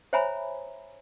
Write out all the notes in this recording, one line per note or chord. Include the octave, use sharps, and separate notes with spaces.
C5 C#5 E5 G#5 A#5 B5